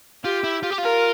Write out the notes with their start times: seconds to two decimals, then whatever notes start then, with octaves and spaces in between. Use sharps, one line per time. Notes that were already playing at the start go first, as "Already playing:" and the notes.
0.24 F4 G4
0.44 E4
0.63 F4
0.70 G4
0.78 F4 A#4